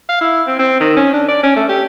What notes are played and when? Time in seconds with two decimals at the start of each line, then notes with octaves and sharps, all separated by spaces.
0.09 F5
0.21 E4
0.47 C4
0.59 C4
0.80 D#3
0.96 C#4
1.14 D4
1.28 D5
1.43 C#4
1.56 A3
1.69 G4